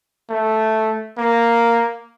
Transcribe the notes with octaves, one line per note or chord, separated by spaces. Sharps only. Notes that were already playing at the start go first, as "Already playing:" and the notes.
A3
A#3